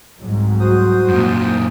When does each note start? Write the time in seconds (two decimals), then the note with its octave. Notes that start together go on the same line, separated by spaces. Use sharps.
0.17 C2 G#2 F#3
0.60 F#4 C5 D#6
1.08 F#2 A#2